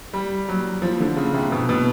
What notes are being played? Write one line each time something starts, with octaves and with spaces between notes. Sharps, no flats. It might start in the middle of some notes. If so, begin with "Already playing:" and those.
G3
F#3
F3
D3
C#3
C3
B2
B2